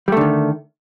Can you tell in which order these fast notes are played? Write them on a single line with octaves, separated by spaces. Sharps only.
G3 A3 D3 D#3